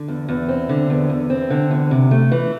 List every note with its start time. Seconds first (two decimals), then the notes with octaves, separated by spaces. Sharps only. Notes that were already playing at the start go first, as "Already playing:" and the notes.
Already playing: D3
0.08 E2
0.29 E2
0.49 C4
0.69 D3
0.90 E2
1.10 E2
1.30 C4
1.50 D3
1.71 E2
1.91 C3
2.11 A3
2.32 E3